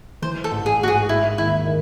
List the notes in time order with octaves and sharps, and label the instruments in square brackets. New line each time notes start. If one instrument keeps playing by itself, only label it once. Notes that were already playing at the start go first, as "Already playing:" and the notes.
[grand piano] E3 [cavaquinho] C5
[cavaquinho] A4
[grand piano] A1
[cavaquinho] G#4
[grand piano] G#2 [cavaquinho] F#4
[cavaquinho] G#4
[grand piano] G#3 [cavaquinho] E4
[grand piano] D#2 [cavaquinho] E4
[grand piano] D#3